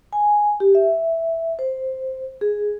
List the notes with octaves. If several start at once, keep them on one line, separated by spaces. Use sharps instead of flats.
G#5
G4
E5
C5
G#4